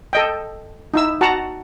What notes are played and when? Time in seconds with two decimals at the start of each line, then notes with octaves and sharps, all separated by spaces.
0.13 A4 D#5 G5
0.94 D#4 E4 E6
1.21 F#4 F#5 A5 A#5